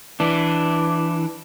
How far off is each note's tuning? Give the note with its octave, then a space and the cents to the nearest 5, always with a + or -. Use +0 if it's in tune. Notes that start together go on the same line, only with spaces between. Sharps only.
E3 +5 D4 +0